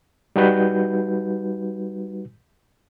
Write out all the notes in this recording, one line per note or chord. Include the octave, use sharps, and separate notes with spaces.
G3 D#4 F#4 B4 G6